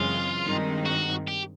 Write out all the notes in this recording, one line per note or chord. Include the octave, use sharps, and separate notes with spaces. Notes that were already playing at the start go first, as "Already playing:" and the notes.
Already playing: F#2 C#3 E3 G#3 C4 F4
G2 D#3 G#3 C4 D#4
F#4
G4